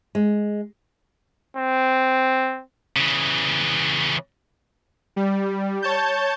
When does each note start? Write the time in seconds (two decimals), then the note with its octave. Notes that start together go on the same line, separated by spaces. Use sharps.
0.15 G#3
1.57 C4
2.96 C#3 E3
5.16 G3
5.82 C#5 A5 G6